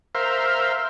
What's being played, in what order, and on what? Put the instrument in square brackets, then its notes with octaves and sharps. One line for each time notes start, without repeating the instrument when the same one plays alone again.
[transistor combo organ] A#4 C5 E5 F5